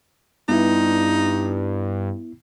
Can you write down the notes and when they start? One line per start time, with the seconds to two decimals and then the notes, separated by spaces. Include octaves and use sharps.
0.49 G2 B3 D#4 E4